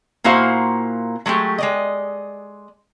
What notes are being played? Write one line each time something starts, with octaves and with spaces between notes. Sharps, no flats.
A#2 A#3 E4 F#4 C5 F5
F#3 G#3 A3 G4
G#3 D5 D#5